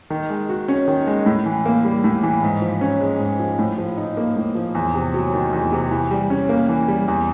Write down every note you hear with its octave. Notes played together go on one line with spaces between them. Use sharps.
D#3
G#3
F#4
C#4
D#3
G#3
A2
E3
A#3
G3
A2
E3
G#2
F3
C#4
G#3
G#2
F3
A2
F3
D#4
A#3
A2
F3
E2
C3
F#3
D#3
E2
C3
E3
G3
C#4
A#3
E3
G3
E2